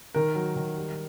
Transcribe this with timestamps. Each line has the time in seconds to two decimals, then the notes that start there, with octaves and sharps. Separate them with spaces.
0.15 D#3 A#4
0.35 F#3
0.56 D#3
0.77 G3